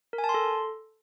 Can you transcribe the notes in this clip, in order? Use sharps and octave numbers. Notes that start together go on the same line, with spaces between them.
A#4
G#5
A5
C6
A4